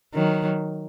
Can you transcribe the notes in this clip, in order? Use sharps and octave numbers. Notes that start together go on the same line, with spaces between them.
D#3 F#3